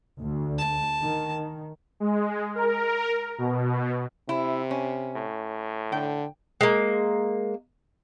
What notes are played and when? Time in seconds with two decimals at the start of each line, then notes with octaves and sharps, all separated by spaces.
0.18 D2
0.59 A5
1.02 D#3
2.00 G#3
2.55 A#4
3.38 B2
4.29 C3 E4
4.71 C#4
5.16 A2
5.92 D3 G5
6.61 G#3 A#3